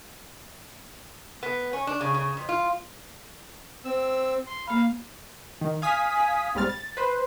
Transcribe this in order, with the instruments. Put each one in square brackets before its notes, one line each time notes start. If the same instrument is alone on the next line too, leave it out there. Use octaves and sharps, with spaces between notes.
[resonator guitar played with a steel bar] B3
C#4
D4
C#3
C#3
F2
F4
[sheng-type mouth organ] C4 E6
C6
[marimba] A#3 B5 [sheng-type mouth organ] F5
[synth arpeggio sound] D#3
F5 G#5 D#6 B6
B1 G#2 G3 C4 F6 A6
A6
B4 C5